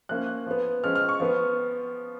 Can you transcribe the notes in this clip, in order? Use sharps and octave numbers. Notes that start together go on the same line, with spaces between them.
F3 A#3 C#4 F#6
F3 B3
F3 G#3 C#4 F6
F6
C#6
F3 B3